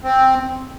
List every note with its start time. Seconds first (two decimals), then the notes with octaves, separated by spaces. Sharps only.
0.03 C4